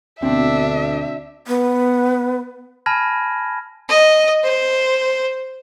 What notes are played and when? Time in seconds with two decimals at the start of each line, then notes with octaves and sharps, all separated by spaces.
0.22 D2 B2 C4 D4 E5
1.47 B3
2.86 G#5 A5 B5 F6 G#6 A#6
3.89 D#5
4.44 C5